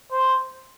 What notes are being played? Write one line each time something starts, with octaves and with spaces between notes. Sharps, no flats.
C5